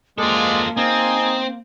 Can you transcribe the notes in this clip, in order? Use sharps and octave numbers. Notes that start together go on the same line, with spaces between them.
G#3 A#3 F4 F#4 A4 C5 D5
C4 D#4 G#4 G#5